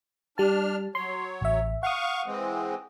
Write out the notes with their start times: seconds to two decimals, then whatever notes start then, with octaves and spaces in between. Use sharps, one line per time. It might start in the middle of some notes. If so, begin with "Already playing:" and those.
0.38 G3 D4 A5 F6
0.95 F#3 C#5 C6
1.41 A1 E5
1.83 F5 F#5 C#6 D#6
2.26 E3 G#3 C4